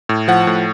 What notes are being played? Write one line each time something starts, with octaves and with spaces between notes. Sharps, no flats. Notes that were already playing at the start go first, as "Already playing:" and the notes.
A2
F3 F#5
A2